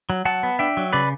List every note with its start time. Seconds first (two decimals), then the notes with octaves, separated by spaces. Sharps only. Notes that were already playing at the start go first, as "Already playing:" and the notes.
0.10 F#3
0.25 F#3 F#5 A5
0.43 B3
0.59 D4 E5 G5
0.77 F#3
0.93 C#3 B4 D5